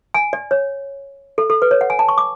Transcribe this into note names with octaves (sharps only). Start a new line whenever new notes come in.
G#5
D5
C#5
A4
A4
B4
C#5
F#5
G#5
A5
C#6
D6